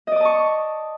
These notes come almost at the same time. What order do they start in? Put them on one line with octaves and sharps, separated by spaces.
D#5 D5 D#6 A5 C#6